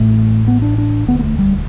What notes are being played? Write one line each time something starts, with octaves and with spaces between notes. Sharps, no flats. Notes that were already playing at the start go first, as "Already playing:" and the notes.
Already playing: A1 A2 A3
B3
D4
D4
E1 D2 D3 B3
B3
A3
G3